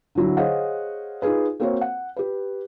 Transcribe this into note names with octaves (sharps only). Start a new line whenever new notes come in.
D3 F#3 E4
G#4 C5 C#5 D#5 F5 F#5
D#4 F4 G#4 B4
A#3 C4 F#4 A#4 C5 C#5
F#5
G4 B4